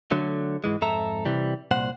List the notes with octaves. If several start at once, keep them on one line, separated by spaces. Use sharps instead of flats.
D3 F#3 A3
G#2 E3 G#3
F2 G#2 A4 E5 A#5
C3 E3 G3
C2 A#2 C5 F#5